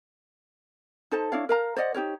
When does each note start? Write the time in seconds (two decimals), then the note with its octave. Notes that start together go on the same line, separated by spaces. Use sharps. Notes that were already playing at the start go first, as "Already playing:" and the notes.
1.11 D#4 A4 C5 A5
1.32 D4 E4 C#5 F5
1.49 A#4 F5 A#5
1.76 C5 D5 D#5 F#5
1.94 D#4 G4 A#4 C#5